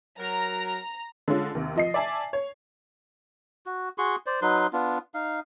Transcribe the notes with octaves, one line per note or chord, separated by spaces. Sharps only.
F#3 A#4 A#5
D3 G#3 C#4 F4
D#2 C3
F3 D#5 C7
D5 E5 G#5 A5
C#5
F#4
F#4 G#4 C6 C#6
C5 D5
F#3 D#4 B4 C6
B3 D4 F4
D#4 F5